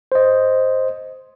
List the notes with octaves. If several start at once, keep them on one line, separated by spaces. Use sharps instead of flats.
C5 D#5